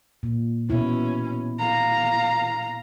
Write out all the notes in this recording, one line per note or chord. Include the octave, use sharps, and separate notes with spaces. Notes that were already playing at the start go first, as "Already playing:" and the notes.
A#2
B2 C#4 E4
F5 A#5